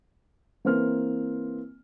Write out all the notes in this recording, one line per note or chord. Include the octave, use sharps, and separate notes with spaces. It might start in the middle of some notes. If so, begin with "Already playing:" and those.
E3 A#3 C4 F6